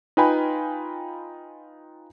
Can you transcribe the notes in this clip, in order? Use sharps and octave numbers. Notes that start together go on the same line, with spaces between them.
D#4 F4 B4 G5 G#5 B5